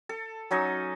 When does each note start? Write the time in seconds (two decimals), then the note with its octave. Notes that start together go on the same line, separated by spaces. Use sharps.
0.09 A4
0.51 F#3 C#4 D#4 D#5